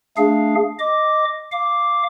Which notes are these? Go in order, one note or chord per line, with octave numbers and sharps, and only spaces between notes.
A3 D4 G#4 F5
D#5 D6
F5 D6